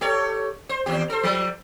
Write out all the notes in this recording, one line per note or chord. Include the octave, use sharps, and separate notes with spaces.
G4 A4 C#5
C5
D#2 G4
A4 C5
F3 G3